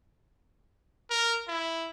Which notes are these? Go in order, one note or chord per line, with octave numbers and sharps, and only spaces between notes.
A#4
E4